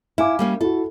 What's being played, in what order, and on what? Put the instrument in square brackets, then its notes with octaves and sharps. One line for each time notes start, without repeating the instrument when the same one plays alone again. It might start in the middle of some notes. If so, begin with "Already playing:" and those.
[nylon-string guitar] E4 [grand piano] F5 G#5 D6
[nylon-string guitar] G3 A#3 C#4
[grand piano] E4 F#4 [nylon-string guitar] A4